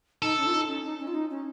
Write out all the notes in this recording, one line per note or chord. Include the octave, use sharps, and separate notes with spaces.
D#4 A4
C#4
F4
D#4
C#4
D#4
C#4
F4
D#4
C#4